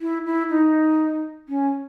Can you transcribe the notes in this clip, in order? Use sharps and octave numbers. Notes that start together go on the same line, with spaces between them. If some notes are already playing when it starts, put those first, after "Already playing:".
E4
E4
D#4
C#4